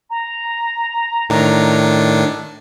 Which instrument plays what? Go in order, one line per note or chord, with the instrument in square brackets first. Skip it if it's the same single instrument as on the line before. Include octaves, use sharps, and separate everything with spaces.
[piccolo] A#5
[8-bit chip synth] A2 D#3 D4